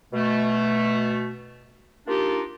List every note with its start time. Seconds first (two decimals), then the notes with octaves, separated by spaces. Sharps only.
0.13 B2 A3
2.07 A#3 D4 D#4 F4 G4